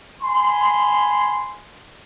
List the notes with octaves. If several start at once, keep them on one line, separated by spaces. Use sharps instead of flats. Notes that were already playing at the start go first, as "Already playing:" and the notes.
G#5 B5 C6